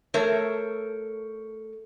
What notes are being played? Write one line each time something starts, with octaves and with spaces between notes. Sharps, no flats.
A3 A4 A#4 C#5